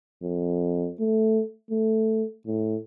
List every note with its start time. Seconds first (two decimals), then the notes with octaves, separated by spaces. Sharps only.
0.23 F2
1.00 A3
1.71 A3
2.46 A2